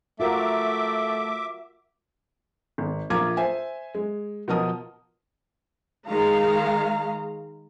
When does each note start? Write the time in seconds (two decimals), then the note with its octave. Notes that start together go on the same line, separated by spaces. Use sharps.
0.20 A3 F4 F#4 A#4 E5 D6
2.78 G#1
3.10 A#1 A#3 F4 A#5 D6 G#6
3.37 C5 E5 G#5
3.95 G#3
4.48 B2 F3 A#4 D#5 D#6
6.06 D#3 G#3 F5 A#5